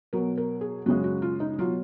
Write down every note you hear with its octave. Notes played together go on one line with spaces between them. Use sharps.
B2 F#3 A#4
A#4
G#4
F#2 C#3 G#3 F#4
F#4
F4
D#4
B2 F#3 F4